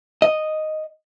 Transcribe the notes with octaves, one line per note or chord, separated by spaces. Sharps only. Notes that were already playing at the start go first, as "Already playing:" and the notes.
D#5